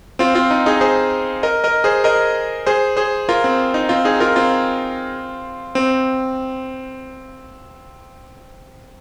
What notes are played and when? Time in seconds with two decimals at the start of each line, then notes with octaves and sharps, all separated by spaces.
0.19 C4 F4
0.35 C4 F4
0.50 D#4
0.66 D#4 G#4
0.81 G#4 C5
1.43 A#4 D#5
1.64 A#4 D#5
1.84 G#4 C5
2.04 A#4 D#5
2.67 G#4 C5
2.97 G#4 C5
3.29 F4 A#4
3.44 C4
3.74 D#4
3.89 C4 F4
4.05 D#4 G#4
4.20 F4 A#4
4.36 C4 F4
5.75 C4